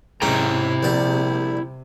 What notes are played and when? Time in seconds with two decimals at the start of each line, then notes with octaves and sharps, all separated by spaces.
0.22 G#2 C3 C#4 E4 G5 A#5
0.83 A#1 G3 A5